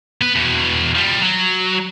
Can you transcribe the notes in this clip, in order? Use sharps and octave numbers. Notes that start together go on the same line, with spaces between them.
B3 B4
E2 B2
F3 G3
F#3